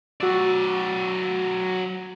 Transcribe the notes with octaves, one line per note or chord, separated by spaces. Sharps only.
F#3 F#4 D5 E6